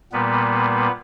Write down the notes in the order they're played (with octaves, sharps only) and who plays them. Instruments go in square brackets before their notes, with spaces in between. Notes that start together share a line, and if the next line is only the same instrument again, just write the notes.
[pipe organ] A#2 G3 A#3 B3 B4